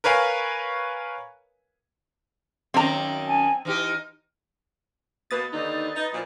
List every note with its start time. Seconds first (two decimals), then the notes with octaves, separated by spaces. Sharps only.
0.04 A#4 B4 C#5 F5 G#5
2.74 F#2 D#3 A#3 C4 A#5
3.27 G#5 A5
3.65 E3 D#4 G4 F6
5.31 B2 A#3 B4 D#6 A6
5.52 D#2 D3 D#4
5.95 D#4
6.12 A#2 F3